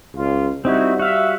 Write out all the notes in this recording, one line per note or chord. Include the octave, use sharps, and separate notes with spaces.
C#2 F4
G3 C4 D#4 E4 F#4
F#4 E5 F5